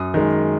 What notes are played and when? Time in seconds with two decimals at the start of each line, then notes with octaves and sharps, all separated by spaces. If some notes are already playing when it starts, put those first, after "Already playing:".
Already playing: F#2 D#6
0.14 D#3 G#3